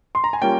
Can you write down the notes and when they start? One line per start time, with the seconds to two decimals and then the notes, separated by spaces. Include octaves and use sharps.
0.15 C6
0.24 A#5
0.33 G#5
0.42 G3 A#3 C#4 F4 G5